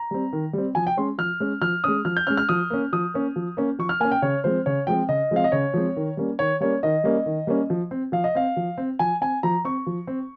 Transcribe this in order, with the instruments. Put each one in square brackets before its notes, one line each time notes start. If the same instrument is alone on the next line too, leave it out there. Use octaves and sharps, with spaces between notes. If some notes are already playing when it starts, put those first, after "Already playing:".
Already playing: [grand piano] A#5
G3 C4
D#3
G3 C4
F3 G#5
G5
G#3 C#4 C6
F3 F6
G#3 C#4
F3 F6
G#3 C#4 D#6
F3 F6
G6
G#3 C#4 F6
F6
F3 D#6
A#3 C#4
F3 D#6
A#3 C#4
F3
A#3 C#4
F3 C#6
F6
A#3 G#5
C#4
G5
C#3 C#5
F3 G#3 C4 C5
C#3 C#5
F3 G#3 C4 G5
C#3 D#5
F3 G#3 C4 F5
D#5
C#3 C#5
F3 G#3 C4
D#3
G3 A#3 C#4
D#3 C#5
G3 A#3 C#4 C#5
D#3 D#5
G3 A#3 C#4
D#3
G3 A#3 C#4
F3
C4
F3 F5
D#5
C4 F5
F3
C4
F3 G#5
C4 G#5
F3 A#5
C4 C#6
F3
C4